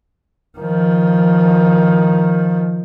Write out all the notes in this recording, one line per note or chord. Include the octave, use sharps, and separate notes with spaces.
D#3 F3